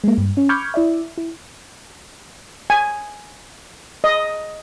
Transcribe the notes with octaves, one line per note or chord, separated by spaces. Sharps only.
G#3 A#3
G2
C#4
B5 C#6 D6 F6 G6 G#6
E4 D5 E5
E4
G#5
D#5